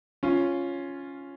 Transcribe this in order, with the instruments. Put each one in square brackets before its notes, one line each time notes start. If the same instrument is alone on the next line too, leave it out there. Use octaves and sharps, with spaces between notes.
[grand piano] C#4 F4